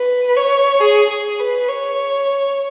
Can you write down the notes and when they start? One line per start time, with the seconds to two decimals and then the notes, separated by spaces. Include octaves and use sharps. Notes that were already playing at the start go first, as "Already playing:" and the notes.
Already playing: B4
0.37 C#5
0.81 G#4
1.09 G#4
1.39 B4
1.68 C#5